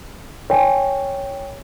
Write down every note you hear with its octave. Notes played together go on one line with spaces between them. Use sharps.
C#5 G5 G#5